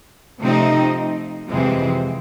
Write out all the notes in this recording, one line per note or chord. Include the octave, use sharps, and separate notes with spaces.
C3 F3 A3 C4 D#4
F2 C3 E3 G#3 C4